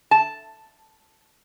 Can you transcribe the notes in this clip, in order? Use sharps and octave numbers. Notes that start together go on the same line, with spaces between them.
A5